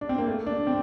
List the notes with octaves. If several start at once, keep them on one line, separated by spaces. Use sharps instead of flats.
D4
C4
A#3
A3
D4
C4